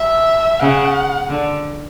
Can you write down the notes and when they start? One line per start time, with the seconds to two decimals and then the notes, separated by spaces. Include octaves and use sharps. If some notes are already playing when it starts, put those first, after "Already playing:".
Already playing: E5
0.59 C#3 F#5
1.29 D3